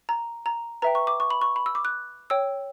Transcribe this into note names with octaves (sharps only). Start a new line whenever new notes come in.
A#5
A#5
B4 E5 G5 A#5
C#6
D6
C#6
B5
C#6
B5
E6
D6
F#6
C#5 G5 E6